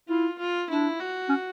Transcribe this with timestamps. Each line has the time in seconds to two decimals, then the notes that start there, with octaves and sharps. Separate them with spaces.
0.09 E4 F4
0.39 F4
0.70 D4 E4
1.00 F#4
1.29 C#4